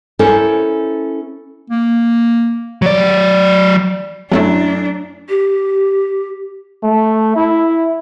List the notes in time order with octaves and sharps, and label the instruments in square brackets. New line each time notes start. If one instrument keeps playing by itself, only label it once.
[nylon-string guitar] C#4 E4 A4 A#4 C5
[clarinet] A#3
[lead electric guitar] F#3 D5
[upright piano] F#2 [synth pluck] F#3 A3 E4 [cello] D4
[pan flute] G4
[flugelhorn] A3
E4